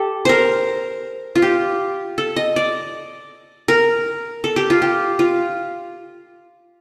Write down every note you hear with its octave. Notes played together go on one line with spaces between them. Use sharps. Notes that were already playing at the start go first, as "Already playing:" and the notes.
Already playing: G4 A4
A#4 C5
F4
G4
A4
D#5
D5
A#4
A4
G4
F4
G4
F4